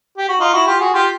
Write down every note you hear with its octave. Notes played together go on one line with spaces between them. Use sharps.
G4
F#4
D#4 F4
E4 F#4
F4 G4
F#4 G#4
F4 G4